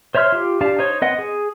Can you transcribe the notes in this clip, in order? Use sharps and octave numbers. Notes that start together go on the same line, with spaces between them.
C5 C#5 E5 C6 F6
F4 G4
D4 G4 F5 A5
D#4 C5 C#5
C4 B4 D#5 F#5
G#4